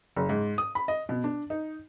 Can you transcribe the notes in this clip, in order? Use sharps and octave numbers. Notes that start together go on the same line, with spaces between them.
F#1
G#2
D#6
B5
D#5
B2
D4
D#4